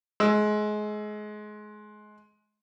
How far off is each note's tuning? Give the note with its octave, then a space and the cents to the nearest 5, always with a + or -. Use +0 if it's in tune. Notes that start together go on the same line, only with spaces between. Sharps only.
G#3 +25 E6 +15